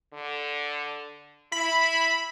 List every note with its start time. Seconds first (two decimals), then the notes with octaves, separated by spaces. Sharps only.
0.14 D3
1.52 E4 B5